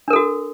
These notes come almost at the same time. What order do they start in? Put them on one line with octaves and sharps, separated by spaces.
D4 A#4 A4 F#4